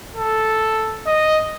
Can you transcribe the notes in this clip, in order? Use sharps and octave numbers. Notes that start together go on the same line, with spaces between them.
A4
D#5